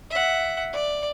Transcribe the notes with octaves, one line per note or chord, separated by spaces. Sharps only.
E5 F#5
D5